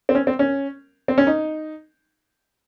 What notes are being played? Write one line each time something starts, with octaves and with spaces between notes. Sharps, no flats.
C4
C#4
C4
C#4
C4
C#4
D#4